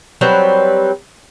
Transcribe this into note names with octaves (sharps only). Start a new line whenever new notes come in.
F#3 G3 C4 B4